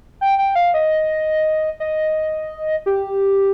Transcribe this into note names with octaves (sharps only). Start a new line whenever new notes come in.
G5
G5
F5
D#5
D#5
G4